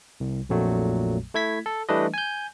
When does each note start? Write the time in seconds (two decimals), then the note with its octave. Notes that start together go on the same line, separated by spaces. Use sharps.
0.20 C2
0.49 A#1 F2 A#2 F#3 A3
1.34 A3 E4 G#6 B6
1.66 A4
1.89 E3 G3 A3 D4 B4 D#5
2.14 G#5 G6